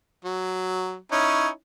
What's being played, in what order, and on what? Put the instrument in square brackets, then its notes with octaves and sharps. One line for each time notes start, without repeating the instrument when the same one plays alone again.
[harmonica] F#3
[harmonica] C#4 D#4 E4 [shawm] C#5